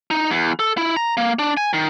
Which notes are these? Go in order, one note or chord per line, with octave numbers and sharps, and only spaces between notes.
D#4
E2
A4
E4
A#5
A#3
D4
G#5
D#3